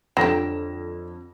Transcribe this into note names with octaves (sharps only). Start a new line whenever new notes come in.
F2 D3 F#3 G4 A#6 E7